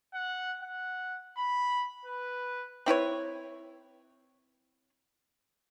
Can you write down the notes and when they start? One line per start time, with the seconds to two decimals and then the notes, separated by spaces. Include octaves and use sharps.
0.14 F#5
0.62 F#5
1.37 B5
2.05 B4
2.86 C4 E4 B4 C#5